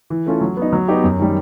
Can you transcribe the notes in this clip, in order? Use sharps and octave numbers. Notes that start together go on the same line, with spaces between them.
E3
A3 C#4 F4 A4
F#3
B3
D#4
F#3
B3 D#4 G4
F#2
D#3 G3